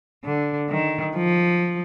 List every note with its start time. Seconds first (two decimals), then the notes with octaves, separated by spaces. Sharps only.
0.25 D3
0.70 D#3
1.16 F3